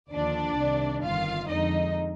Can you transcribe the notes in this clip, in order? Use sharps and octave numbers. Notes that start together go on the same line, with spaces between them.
D#2 D3 F3 D4 D5
C2 C3 D#3
G1 F2 D#3 F4 F5
F2 D3 G#3 D#4 D#5